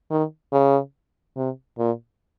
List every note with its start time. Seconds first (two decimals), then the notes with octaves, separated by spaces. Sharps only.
0.11 D#3
0.52 C#3
1.36 C3
1.78 A#2